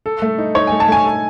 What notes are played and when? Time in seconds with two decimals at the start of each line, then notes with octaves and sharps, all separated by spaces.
0.06 A4
0.22 A3
0.38 D#4
0.55 D#4 C#5
0.67 G#5
0.71 A3
0.80 A5
0.88 A3 G#5
1.05 A4